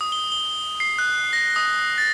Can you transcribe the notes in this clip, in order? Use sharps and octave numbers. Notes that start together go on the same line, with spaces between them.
D#6
G7
G7
C7
F#6
A#6
D#6
A6